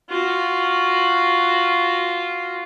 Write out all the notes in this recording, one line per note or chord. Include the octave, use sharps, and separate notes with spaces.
F4 F#4